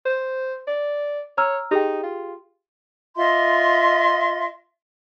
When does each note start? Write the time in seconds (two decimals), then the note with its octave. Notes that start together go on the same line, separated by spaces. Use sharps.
0.06 C5
0.67 D5
1.38 C#5 A#5 E6 F6
1.71 D#4 G4 G#4 G5
2.03 F4
3.16 F4 D#5 E5 C6